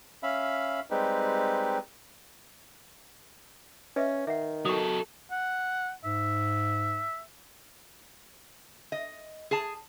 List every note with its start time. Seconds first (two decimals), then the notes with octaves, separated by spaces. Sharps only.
0.23 C#4 E5 F5 B5
0.91 G3 G#3 C4 D#4 G4 B4
3.96 C#4 B4 D#5 E5
4.27 D#3 E5 F#5
4.65 F#3 A4 C#6 D#6
5.31 F#5
6.05 G#2 E5
8.92 D#5
9.51 G#4 A5